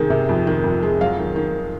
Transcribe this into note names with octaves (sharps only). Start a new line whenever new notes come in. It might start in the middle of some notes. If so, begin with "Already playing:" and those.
Already playing: C3 D#3 G#3
C3
F2
D#3
F2
G#3
F#3 F5
D#3
D#3